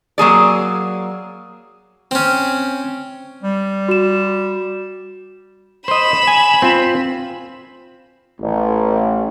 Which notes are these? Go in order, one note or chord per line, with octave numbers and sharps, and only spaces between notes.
F#3 A#3 G#4 D5
C4 C#4
G3
F#4 E7
C5 D#5 B5 E7
G#5
C4 F4
A1